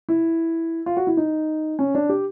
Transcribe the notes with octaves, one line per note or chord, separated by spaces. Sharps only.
E4
F4
F#4
E4
D#4
C#4
D4
G4